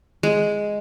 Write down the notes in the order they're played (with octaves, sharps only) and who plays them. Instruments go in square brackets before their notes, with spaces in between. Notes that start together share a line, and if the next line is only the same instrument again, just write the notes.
[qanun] G#3